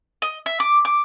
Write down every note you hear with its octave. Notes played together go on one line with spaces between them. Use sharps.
D#5
E5
D6
D6